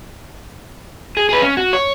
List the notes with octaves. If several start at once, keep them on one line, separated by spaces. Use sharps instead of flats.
G#4
G#4 B4
C#4
F#4
C#5